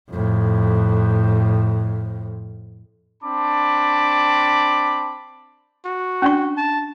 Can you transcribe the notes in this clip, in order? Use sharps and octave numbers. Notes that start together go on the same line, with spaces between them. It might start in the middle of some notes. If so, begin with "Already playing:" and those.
F2 A2
C4 D4 A5 B5 D6
F#4
C#4 D4 C#6
A5